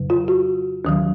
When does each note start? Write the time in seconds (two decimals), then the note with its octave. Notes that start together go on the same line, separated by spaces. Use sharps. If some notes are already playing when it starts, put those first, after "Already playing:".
Already playing: F2 C#3 F#3
0.10 F4
0.28 F#4
0.85 D#2 D#3 F#3